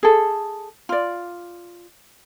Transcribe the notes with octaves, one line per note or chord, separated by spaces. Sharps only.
G#4 A4
F4 D5